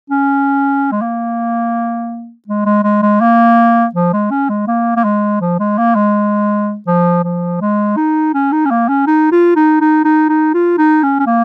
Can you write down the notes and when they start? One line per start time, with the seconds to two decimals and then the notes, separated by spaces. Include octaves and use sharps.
0.10 C#4
0.91 G#3
1.01 A#3
2.47 G#3
2.66 G#3
2.84 G#3
3.02 G#3
3.20 A#3
3.94 F3
4.13 G#3
4.31 C#4
4.49 G#3
4.67 A#3
4.96 A#3
5.04 G#3
5.41 F3
5.59 G#3
5.78 A#3
5.95 G#3
6.87 F3
7.24 F3
7.61 G#3
7.97 D#4
8.34 C#4
8.52 D#4
8.66 C#4
8.71 A#3
8.89 C#4
9.07 D#4
9.32 F4
9.56 D#4
9.81 D#4
10.04 D#4
10.29 D#4
10.54 F4
10.78 D#4
11.03 C#4
11.20 C#4
11.26 A#3